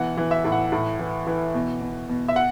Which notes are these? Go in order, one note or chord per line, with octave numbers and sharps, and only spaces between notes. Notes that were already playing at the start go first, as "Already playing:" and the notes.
Already playing: B2 E3 F#5
E3
E5
A2
F#5
A2
E3
E3
B2
B2
B2
E5
F#5